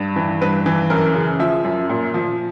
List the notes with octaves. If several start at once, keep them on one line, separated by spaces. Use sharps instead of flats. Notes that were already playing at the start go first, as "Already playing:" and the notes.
Already playing: G2
E3
G2 B4
E3
F#2 A#4
C#3
F3 E5
F#2
A#2
F3